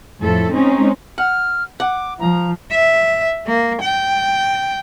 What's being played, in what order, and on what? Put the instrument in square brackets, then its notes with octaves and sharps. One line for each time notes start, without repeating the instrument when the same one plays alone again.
[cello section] F2 A2 E4 A4
G#3 C4 C#4 D#4
[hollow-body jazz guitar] F#5 [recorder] F6
[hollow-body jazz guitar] F#5 [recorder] D6
[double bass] F3 [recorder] A#5
[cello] E5
A#3
G5